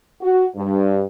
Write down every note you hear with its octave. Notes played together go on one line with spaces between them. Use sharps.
F#4
G2